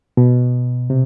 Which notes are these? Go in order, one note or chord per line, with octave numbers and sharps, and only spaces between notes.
B2
C3